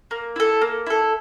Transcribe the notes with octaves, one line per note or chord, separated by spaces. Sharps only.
A#3
E4 A4
A#3
E4 A4